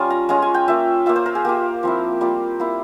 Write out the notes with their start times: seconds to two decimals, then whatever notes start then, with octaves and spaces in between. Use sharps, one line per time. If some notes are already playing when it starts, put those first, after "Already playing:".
Already playing: G3 C#4 F4
0.10 A#5
0.29 G#3 C#4 F4 A#5
0.42 G#5
0.54 G5
0.68 A#3 F4 E5
1.06 A#3 F4 E5
1.16 C5
1.26 A#4
1.35 G#4
1.45 A#3 F4 G4
1.83 F3 C4 E4
2.21 G3 A#3 F4
2.60 A#3 E4